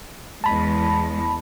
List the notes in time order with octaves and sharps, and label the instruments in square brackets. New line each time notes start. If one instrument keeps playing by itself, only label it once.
[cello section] E2 G#3 [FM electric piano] A5 B5